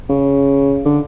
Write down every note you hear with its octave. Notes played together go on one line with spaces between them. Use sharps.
C#3
D3